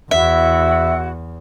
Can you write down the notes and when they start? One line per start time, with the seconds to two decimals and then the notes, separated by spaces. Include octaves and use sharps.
0.11 E2 E4 F#4 E5 F#5